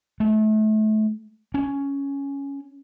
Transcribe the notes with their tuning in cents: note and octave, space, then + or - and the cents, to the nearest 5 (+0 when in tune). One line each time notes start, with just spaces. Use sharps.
A3 -30
C#4 +5